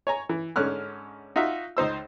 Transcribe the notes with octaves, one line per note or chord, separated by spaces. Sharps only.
C#5 G#5 A#5
E3
G#2 D3 C#4 F6 F#6
D#4 F4 F#4 E5
C#2 D#4 C5 E6